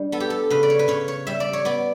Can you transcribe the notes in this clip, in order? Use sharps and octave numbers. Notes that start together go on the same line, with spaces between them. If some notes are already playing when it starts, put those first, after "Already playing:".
Already playing: G3 D4
B3 A4
G4
A4
C#3 B4
D5
C#5
B4
C#3 C#5
C#5
G3 E5
D5
C#5
B3 D5